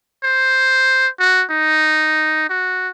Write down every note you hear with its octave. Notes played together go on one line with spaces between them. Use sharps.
C5
F#4
D#4
F#4